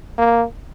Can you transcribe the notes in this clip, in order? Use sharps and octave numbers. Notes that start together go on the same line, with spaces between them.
A#3